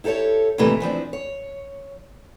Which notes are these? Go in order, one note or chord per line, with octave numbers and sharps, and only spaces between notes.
E4 G4 A4 A#4 C#5
D#2 A2 C3 E3 G3 A3
E3 F3 C4 D4
C#5